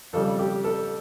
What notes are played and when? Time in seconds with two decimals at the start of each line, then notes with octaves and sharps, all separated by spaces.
0.13 F2 C#3 G3 A4
0.39 G4
0.64 A4